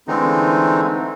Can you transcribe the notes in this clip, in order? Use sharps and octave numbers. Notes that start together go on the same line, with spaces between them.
D3 E3 G#3 A3 C4 D#4